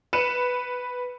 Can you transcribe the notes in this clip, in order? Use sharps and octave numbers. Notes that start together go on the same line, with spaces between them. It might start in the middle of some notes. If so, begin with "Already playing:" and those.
B4 C#7 D#7 E7